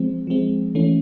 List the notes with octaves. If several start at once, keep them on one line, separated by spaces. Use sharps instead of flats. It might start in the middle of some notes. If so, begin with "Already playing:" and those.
Already playing: F3 G#3 C4
F3 G#3 C4
E3 A3 C#4